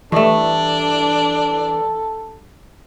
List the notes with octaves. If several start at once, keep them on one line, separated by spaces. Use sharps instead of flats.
G2 E3 A3 D4 A4